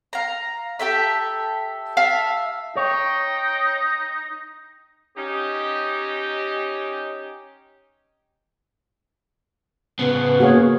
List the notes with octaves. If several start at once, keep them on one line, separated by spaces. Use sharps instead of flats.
F5 A#5
G4 A4 E5
E5 F5 A5
D#4 C#5 G5
C#4 D#4 G4
C#3 B3 B4
A#3 F#4 G#4 C#5